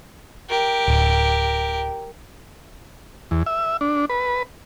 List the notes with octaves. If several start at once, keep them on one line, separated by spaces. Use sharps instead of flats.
G4 A#4
D1
E2
E5
D4
B4